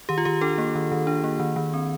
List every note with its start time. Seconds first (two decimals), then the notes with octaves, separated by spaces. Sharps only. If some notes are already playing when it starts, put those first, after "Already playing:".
0.09 D#3 G4
0.18 F4
0.25 D#3 G4
0.41 D4 A4
0.58 A#3
0.75 D#3
0.92 D#3
1.07 D4
1.24 A#3
1.40 D#3
1.56 D#3
1.74 C4